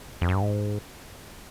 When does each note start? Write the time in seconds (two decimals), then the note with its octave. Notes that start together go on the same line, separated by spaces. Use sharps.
0.21 F2
0.29 F#2
0.35 G2
0.42 G#2